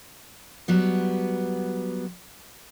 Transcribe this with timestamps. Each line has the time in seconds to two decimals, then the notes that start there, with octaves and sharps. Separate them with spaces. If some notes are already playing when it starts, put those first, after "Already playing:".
0.68 F#3 G3 B3